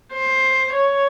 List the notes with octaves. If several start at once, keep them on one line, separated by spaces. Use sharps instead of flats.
C5
C#5